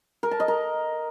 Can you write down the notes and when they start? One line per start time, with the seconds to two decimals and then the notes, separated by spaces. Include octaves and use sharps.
0.23 A#4
0.31 A5
0.40 D#5
0.48 A#4